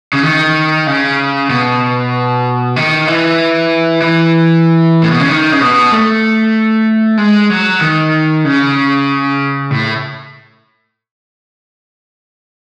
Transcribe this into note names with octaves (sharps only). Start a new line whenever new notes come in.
C#3
D#3
C#3
B2
D#3
E3
E3
A2
B2
C#3
D#3
C#3
B2
A3
G#3
F#3
D#3
C#3
A2